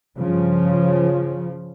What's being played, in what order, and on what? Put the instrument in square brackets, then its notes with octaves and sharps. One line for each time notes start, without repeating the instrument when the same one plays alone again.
[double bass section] G2 C#3 F3